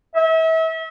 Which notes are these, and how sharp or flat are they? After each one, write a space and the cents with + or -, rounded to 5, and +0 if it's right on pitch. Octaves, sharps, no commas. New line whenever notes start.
E5 -35